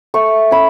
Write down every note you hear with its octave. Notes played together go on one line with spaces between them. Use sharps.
A3 C#6
C#4 B5